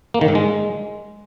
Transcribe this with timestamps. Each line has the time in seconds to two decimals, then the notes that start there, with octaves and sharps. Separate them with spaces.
0.14 A#3
0.21 D#3
0.28 G#2
0.35 G#3